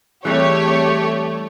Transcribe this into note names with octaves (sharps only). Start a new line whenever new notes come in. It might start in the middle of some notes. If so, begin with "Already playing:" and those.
E3 G3 A3 C4 G4 G#4 C#5